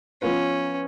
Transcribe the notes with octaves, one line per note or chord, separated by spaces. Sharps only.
F3 B3 C#4 F4 B4